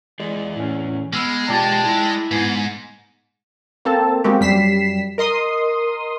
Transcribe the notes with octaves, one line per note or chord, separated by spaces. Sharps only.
E3 G#3 G#4 D5
A2 C#4
G#3 B3 B5 E6 F6
B2 F4 G4 D5 G5 A5 D6 A6
E4
G#2 B3 G#5 C7
A#3 C4 A4 A5
G#3 A#3 C4 F#4 G4
F#2 G3 B6 C7 E7
A#4 D#5 C6 D#6